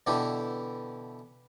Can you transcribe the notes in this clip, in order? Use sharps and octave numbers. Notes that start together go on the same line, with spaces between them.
B2 D3 E3 D4 E4 G4